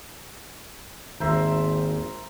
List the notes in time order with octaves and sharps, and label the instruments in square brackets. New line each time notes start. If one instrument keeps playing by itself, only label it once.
[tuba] G#1 [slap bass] D#2 D#3 [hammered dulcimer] A#4 C5 E5